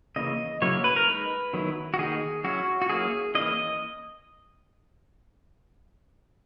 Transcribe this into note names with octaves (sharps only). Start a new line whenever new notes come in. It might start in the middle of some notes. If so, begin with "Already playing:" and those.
C#3 E3 A#3 D#5
C#3 F#3 A#3 E4 C#5
B4
A#4
G#3 D#4 B4
D#3 F#3 B3 E4
F#4
D#3 A#3 D#4 G#4
F#3 C#4 E4 F#4
F#4
F#3 A#3 C#4 E4 G#4
E3 A#3 C#4 E4 D#5